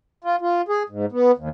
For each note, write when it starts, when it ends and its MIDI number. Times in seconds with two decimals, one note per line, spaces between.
0.24 0.36 65
0.41 0.61 65
0.68 0.83 68
0.89 1.06 44
1.12 1.31 59
1.37 1.49 39